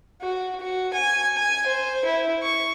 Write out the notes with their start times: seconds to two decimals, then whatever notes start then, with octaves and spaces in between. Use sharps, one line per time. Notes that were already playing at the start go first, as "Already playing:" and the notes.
0.21 F#4
0.60 F#4
0.93 G#5
1.36 G#5
1.67 C5
2.05 E4
2.43 C#6